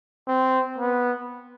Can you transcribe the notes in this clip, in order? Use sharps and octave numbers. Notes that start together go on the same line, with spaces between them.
C4
B3